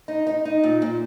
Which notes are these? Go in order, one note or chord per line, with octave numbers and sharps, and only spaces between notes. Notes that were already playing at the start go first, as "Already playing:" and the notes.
D#4
D#4
D#4
A#2
A#2